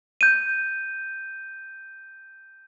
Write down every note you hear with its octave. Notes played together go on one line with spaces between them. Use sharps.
G6 D#7